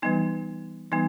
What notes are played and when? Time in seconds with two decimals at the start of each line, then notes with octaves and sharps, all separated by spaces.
0.02 E3 G3 B3 D#4
0.92 E3 G3 B3 D#4